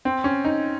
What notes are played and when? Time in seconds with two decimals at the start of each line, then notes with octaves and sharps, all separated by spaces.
0.05 C4
0.24 C#4
0.45 D#4